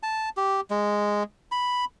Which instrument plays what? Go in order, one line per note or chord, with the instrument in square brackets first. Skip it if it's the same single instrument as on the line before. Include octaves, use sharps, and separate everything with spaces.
[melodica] A5
G4
G#3
B5